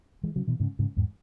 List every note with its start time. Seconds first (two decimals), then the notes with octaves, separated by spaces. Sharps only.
0.23 E3 G#3
0.36 C#3 F#3
0.47 B2 E3
0.60 G#2 C#3
0.79 G#2 C#3
0.97 E2 G#2